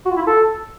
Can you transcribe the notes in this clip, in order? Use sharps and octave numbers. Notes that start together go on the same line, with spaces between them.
F#4
F4
E4
F4
A4